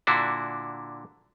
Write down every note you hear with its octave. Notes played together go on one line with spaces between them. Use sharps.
A#2 D3 D4 E4 F#4